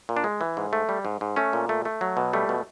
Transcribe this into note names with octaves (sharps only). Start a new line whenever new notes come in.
A#2
D4
G#3
E3
G#2
A3
G3
G#2
G#2
A3 C#4
A#2
A3
A3
F#3
B2
G3 A3
B2